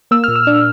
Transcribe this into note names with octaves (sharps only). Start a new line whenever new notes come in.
A#3 E6
A#2 F6
E6
D4